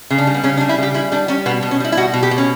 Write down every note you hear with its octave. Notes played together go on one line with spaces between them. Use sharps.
C#3
D4
G3
B3
C#3 C#4
D4
G3
E4
C#3 G4
G3 E4
G3 D4
G3 C#4
B2 B3
B2
C#4
G3 E4
E4
B2 F#4
B2
G4
B2
C#4